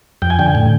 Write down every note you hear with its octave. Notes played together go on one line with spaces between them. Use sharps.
F2 G5
G#5
D3 G5
A2